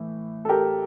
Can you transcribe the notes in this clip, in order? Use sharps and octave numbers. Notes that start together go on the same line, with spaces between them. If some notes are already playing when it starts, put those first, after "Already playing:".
Already playing: A2 E3
A4
G4 A#4